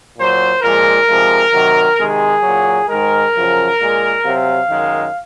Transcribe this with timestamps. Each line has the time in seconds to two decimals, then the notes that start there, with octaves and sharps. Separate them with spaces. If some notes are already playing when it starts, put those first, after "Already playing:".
0.17 A#2 F#3 C5
0.62 A#2 F3 G#3 A#4
1.07 C3 F3 G#3
1.52 C3 D#3 F#3
1.98 C3 D#3 G#3 G#4
2.42 A#2 F#3
2.88 G#2 D#3 G#3 A#4
3.33 F#2 C#3 F3
3.79 A#2 G#3
4.24 C3 F#3 F5
4.69 F#2 D#3 G#3